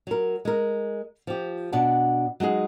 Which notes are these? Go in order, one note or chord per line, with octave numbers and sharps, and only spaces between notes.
F#3 A#4
G#3 A#4
F3 G4
B2 D4 F#5 A5
F#3 G#3 D#4 G#4